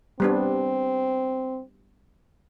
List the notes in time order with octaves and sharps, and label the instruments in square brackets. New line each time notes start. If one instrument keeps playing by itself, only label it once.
[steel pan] G3 B3 D4 [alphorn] C4